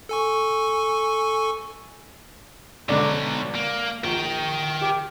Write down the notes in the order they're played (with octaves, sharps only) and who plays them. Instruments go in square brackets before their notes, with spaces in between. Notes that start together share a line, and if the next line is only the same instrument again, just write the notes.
[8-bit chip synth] A4 G#5 C#6
[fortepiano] G#2 D3 D5 [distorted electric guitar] B2 F#3
[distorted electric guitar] A#3
[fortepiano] A#1 [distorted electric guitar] A#4 G5
[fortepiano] G4 D6